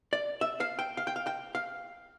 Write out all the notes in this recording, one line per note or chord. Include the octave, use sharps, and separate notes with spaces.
D5
E5
F5
G5
F5
G5
F5
G5
F5